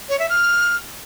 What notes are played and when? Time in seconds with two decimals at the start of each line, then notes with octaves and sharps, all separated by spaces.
0.09 C#5
0.19 E5
0.29 F6